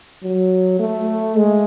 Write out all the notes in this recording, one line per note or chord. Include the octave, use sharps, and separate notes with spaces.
F#3
A3
G#3